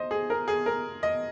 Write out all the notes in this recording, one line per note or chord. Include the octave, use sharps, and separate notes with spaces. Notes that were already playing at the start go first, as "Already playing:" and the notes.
Already playing: C5 D#5
G#4
A#4
G#4
A#4
D#5